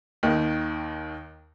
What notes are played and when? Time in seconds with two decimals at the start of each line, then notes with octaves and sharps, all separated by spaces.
0.23 D#2 D#3